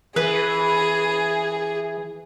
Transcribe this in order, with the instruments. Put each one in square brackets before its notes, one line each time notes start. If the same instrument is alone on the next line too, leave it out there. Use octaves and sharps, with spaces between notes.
[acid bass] E3 [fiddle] G#4 [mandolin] B4